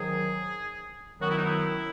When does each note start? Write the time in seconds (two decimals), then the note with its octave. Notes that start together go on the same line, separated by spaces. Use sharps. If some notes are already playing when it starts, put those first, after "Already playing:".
Already playing: G#2 D#3 F#3 G#4
1.20 F#2 D#3 F#3 B3 F#4
1.27 E4
1.36 D#4
1.44 E4